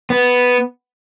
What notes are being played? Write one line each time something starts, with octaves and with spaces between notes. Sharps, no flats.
B3